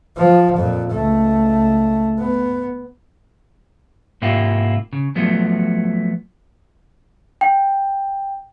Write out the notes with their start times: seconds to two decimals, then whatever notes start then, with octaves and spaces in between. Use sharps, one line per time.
0.17 F3
0.57 F2 A#2
0.92 C#2 A3
2.19 B3
4.22 G#2 C3 A#3 E4 F4 G4
4.93 C#3
5.16 F3 F#3 A3 B3
7.41 G5